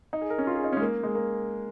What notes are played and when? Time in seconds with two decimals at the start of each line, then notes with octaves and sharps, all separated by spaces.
0.13 D#4
0.21 G#4
0.30 A#4
0.38 C#4
0.47 F4
0.55 G#4
0.64 D#4
0.72 C#4
0.77 G#3
0.81 A#3
1.03 G#3
1.15 A#3